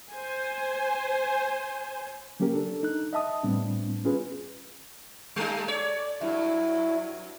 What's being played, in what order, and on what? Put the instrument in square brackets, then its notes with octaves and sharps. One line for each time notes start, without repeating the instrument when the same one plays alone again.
[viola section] C5 G#5
[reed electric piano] F#3 A#3 C#4 G4 A#4
D4 A4
D#4 F#6
D#5 E5 A5 D#6
A2 G3 B3 C4 D4
C#4 F4 G#4 B4
[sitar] G3 A3 D#4 [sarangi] A4
[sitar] C#5 [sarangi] D5
[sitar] G2 [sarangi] F#3 [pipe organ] E4